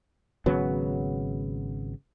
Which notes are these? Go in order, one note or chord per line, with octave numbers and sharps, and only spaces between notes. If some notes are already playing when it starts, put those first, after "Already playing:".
G#1 C#3 F#3 B3